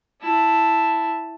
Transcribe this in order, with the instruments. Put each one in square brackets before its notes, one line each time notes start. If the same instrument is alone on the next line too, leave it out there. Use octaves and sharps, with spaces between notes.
[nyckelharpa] E4 A5